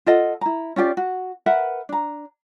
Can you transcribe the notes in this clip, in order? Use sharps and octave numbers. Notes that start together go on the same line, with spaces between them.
F4 A4 D#5 F#5
E4 A#5
C#4 F4 G4 D5
F#4
A#4 B4 E5 F#5
D4 A#5